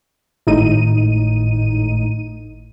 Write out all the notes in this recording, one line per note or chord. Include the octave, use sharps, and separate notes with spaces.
G#1 A2 D#4 D#7